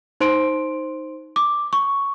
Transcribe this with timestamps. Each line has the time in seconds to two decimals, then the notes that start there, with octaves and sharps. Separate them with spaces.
0.20 D#4 C5 C6 D7
1.36 D6
1.73 C#6